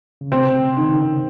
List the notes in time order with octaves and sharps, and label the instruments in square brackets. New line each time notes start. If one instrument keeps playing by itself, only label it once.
[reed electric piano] C#3
[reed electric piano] C3 [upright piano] C4
[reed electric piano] C#3
[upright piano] D#3
[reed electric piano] C#3